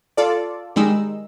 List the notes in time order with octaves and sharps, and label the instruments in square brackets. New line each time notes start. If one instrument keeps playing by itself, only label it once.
[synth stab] F4 A4 D5
D#3 G3 G#3 D#4 E6